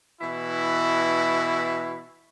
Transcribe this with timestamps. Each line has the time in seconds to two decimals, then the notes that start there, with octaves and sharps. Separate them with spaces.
0.21 B2 E3 E4